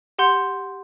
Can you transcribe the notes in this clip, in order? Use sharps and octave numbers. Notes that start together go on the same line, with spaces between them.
G4 F#5 C6 G6 C#7